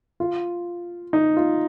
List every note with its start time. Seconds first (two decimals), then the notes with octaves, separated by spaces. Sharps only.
0.20 F4
1.13 D#4
1.37 F4